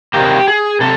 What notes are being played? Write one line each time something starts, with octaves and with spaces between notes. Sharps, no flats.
C3 D#3 G3 A#3 G4
G#4
C3 A4